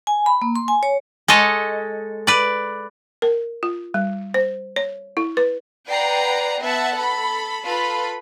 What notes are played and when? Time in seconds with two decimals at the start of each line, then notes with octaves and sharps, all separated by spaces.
0.07 G#5
0.26 B5
0.42 A#3
0.56 C6
0.68 G#5
0.83 C#5
1.28 G#3 A4 C#5 D#5
2.27 B4 D5
3.22 A#4
3.63 F4
3.94 G3
4.34 C5
4.76 C#5
5.17 E4
5.37 B4
5.89 B4 D5 F#5 G5 A#5 C7
6.61 B3 E5 F#5 A5
6.97 A4 B5
7.65 F4 A4 B4 B5